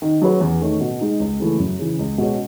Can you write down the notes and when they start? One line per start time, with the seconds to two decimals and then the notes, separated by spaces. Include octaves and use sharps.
0.02 D#3
0.22 F#3 C#4 G#4 B4
0.41 E2
0.61 D#3 A3 C#4
0.81 B2
1.01 G#3 D#4
1.20 C#2
1.40 C#3 E3 A3
1.59 F#2
1.79 C#3 E3
1.99 C#2
2.18 B2 G#3 C#4